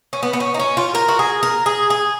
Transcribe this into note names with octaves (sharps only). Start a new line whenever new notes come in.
C#4
B3
B3
C#4
D#4
C#4
F4
A#4
F#4
G#4
A#4
G#4
G#4